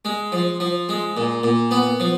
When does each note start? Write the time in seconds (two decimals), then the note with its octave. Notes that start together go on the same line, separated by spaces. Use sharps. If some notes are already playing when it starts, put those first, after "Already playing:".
0.05 G#3
0.32 F3
0.60 F3
0.89 G#3
1.17 A#2
1.43 A#2
1.71 B3
2.00 F3